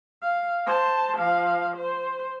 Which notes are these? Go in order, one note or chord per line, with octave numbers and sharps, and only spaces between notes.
F5
C5 A5
F3 F5
C5